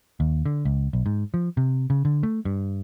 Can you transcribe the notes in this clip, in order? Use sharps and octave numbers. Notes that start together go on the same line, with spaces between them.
D#2
D3
C#2
B1
G#2
F3
C3
C#3
D3
A3
G2